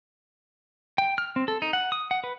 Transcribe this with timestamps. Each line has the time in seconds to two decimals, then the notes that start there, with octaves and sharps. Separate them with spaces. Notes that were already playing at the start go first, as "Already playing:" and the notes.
0.98 G5
1.18 F6
1.36 C4
1.48 A4
1.62 D#4
1.73 F#5
1.92 D#6
2.11 F#5
2.24 B4